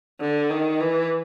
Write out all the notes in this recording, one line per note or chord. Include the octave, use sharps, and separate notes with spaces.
D3
D#3
E3